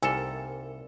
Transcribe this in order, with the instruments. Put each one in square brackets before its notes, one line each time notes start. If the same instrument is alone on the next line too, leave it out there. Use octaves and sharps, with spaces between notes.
[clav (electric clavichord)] C2 A4 [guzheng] C3 G3 A#3 [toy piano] D#4 G#5 E6